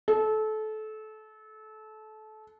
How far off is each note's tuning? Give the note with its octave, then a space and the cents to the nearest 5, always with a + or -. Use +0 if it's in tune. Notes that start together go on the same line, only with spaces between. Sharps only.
A4 -25